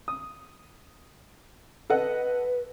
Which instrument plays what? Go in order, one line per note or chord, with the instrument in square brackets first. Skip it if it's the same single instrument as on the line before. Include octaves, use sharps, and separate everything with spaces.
[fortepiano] D#6
[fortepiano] A4 D#5 F#5 [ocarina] B4